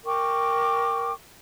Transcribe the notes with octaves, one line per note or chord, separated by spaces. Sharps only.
A#4 G5 C#6 D6